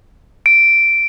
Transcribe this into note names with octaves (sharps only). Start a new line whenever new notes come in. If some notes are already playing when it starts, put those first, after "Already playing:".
D7